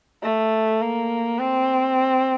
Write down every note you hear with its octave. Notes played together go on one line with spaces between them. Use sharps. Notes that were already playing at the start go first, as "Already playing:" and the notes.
A3
A#3
C4